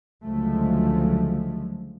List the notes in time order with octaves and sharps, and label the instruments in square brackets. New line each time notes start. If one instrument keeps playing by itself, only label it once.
[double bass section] C#2 D3 F3 F#3 G#3 A3